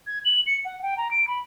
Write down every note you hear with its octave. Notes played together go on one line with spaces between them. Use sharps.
G#6
F#7
C#7
F#5
G5
A#5
D7
B5